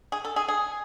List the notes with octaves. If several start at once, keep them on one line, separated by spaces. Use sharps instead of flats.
G#4
A4
G#4
G#4